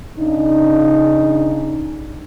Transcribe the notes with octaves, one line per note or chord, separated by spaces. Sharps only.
C#3 D4 D#4